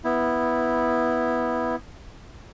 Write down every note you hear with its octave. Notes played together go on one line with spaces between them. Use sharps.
B3 E4